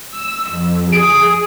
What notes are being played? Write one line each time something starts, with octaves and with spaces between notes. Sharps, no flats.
E6
F2
G#4 D#6 D7